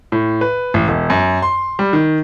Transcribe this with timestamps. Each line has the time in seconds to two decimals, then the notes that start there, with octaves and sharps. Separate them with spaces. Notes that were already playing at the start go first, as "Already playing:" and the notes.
0.12 A2
0.41 B4
0.74 A1
0.88 E1
1.10 F#2
1.42 C6
1.79 G3
1.93 D#3